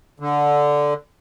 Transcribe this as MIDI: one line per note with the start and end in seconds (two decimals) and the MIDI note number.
0.20 0.94 50